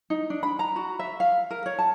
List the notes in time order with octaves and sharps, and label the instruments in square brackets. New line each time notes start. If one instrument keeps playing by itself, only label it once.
[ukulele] D#4
D4
B5
A#5
F#4
E5
F5
A#4
C#5
A5